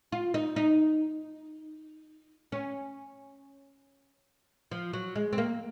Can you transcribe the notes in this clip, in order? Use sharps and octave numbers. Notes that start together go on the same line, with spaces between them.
F4
D#4
D#4
C#4
F3
F#3
G#3
C4
A#3